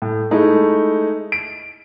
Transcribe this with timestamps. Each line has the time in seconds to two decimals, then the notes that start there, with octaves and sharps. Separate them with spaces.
0.02 A2
0.31 G#3 A3 D#4 E4
1.32 D7